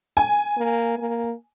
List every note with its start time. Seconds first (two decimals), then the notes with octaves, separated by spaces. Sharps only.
0.17 G#5
0.57 A#3
0.98 A#3